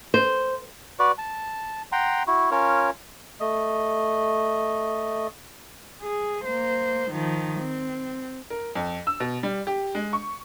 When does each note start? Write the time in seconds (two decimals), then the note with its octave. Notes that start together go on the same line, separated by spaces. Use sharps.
0.14 C5
0.99 F#4 B4 D5
1.18 A5
1.92 F#5 G5 A#5 C6
2.27 E4 F#4
2.51 C#4 F4 A#4 C#5
3.40 A3 D#5
6.02 G#4
6.45 A#3 C5
7.12 D#3 F3
7.60 C4
8.50 A#4
8.75 F2
9.07 E6
9.20 B2
9.43 G3
9.67 G4
9.95 G#3
10.13 C#6